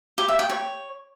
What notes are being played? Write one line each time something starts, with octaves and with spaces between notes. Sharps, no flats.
G4
E5
G5
C#5